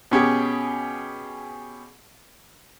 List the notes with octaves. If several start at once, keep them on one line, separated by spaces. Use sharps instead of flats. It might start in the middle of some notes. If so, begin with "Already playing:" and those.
B2 C#4 G4 G#4